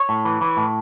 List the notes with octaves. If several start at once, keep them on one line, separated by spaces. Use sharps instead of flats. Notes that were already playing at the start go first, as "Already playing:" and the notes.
Already playing: C#5
A2
E3
E3
A2